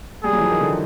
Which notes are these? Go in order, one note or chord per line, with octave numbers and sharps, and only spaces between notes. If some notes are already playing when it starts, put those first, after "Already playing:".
G3 G#4
F#3
E3
F3
D#3
D3